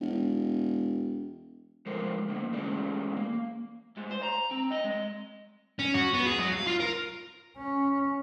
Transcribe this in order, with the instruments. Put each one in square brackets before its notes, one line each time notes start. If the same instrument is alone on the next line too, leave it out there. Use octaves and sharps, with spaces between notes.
[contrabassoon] E1
[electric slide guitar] F3 G#3 A3 A4 A#4 C5
D3 A3 A#3
E3 G#3 A3 C#4 G#4 D5
A#3
[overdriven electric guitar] G#2
C5
A#5
C4
D#5
G#3
[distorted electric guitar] C#4
F#4
B3
G#4
F#3
F5
F4
A#4
[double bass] C#4